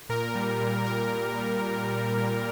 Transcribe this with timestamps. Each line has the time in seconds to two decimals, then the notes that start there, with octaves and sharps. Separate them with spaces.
0.09 A#2 A#4
0.35 G3
0.61 A#2
0.87 G3 A#4
1.13 A#2
1.39 G3
1.65 A#2
1.90 G3
2.16 A#2